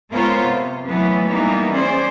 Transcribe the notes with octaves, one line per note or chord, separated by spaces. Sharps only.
G#3 B3 F4 A#4 C5 C#5
C3
E3 F#3 A3 B3 B4
E3 G3 A#3 B3 D#4
C#4 G#4 C5 D5